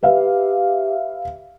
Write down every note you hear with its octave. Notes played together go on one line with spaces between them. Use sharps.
G4 B4 E5 F5